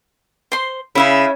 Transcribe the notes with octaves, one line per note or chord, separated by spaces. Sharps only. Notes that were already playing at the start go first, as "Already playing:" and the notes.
C5 C6
C#3 E4 E5 B5